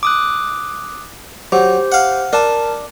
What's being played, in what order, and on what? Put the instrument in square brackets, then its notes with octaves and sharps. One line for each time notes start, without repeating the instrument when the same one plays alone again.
[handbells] D6 D#6 F#6
[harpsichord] F#3 [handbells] G4 C5
[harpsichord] F5 F#5
[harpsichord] D4 [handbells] A#4 A5